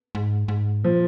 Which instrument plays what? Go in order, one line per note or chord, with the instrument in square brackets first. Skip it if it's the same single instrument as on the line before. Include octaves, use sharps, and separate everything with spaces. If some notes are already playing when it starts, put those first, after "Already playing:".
[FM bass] G#2
G#2
[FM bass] A#2 [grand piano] F3